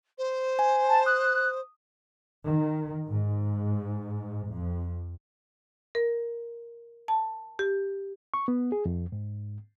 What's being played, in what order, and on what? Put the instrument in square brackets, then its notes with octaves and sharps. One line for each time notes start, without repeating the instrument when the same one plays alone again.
[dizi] C5
[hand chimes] G#5
[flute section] A5
[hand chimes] D#6 [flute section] F#6
[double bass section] D#3
G#2
F2
[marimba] A#4
A5
G4
[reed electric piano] C#6
B3
G#4
F2
G#2